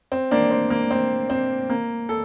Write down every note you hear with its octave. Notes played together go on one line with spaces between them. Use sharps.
C4
A#3 D4
C4
A#3
C4
C4
A#3
A4